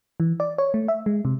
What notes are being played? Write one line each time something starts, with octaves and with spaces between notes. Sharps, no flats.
E3
D5
C#5
A3
E5
G#3
C3